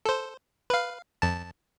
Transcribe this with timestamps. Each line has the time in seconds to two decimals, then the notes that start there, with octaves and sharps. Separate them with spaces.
0.05 A4 C5
0.70 B4 F5
1.22 F2 A5